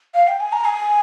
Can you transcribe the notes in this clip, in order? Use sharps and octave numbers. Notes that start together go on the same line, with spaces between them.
F5
G5
G#5
A#5
G#5